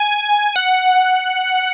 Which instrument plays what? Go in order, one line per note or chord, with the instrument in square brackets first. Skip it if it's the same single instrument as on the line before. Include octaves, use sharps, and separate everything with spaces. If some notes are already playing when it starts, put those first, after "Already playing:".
Already playing: [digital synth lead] G#5
F#5